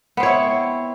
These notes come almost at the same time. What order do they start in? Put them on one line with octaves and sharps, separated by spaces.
B3 C4 C#5 E4